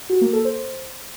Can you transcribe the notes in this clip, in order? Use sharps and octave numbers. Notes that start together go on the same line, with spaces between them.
F#4
A#3
A4
C5